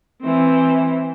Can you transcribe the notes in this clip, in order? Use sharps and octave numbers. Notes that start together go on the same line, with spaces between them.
E3 C4